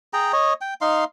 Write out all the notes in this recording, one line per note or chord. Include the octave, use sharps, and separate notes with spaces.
G#4 G5 A#5
C#5 D#5
G5
D#4 F5 C6